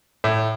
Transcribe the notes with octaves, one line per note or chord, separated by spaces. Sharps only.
A2